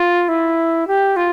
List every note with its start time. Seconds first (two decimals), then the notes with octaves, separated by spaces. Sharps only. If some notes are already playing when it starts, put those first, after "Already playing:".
Already playing: F4
0.28 E4
0.88 G4
1.16 F4